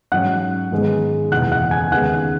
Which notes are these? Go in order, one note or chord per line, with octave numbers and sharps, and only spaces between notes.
G#2 F#3 C#4 F#5 F#6
G#2 D#3 G#3 B3 D#4
F#1 E2 B2 F#5 F#6
F#5 F#6
G#5 G#6
D#2 C#3 G#3 B3 F#5 F#6